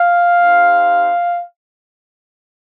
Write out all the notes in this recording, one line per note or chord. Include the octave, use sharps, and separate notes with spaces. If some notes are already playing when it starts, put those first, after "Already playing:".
Already playing: F5
C4 D#4 G4